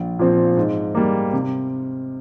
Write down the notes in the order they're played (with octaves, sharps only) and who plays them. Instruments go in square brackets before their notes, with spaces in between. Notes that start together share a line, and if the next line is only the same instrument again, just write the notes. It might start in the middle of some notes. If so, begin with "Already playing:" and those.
Already playing: [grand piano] A#1
A#2 F3 C4
G#2
G3 A#3
C3